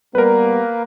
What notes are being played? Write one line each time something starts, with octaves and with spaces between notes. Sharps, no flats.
G3 A#3 B3 A#4 B4